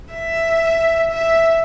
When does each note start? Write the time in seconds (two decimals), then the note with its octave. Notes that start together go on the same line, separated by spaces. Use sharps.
0.14 E5
1.11 E5